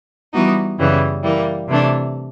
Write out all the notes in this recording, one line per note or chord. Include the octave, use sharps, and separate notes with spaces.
E3 G3 B3 D#4 F#4
F#2 C#3 E3 G3 B3
E3 G3 A#3
C3 E3 A3 D4